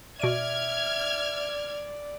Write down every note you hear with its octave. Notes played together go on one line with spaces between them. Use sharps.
B2 D5 E5 F6 G#6 D7 D#7